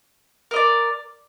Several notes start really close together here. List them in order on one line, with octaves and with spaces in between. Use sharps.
A#4 D#5 D5